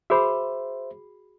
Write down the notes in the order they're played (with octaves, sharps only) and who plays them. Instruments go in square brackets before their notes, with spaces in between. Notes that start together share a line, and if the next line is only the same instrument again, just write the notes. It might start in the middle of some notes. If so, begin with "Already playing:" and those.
[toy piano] F#4 G#4 B5 [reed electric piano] C5 E5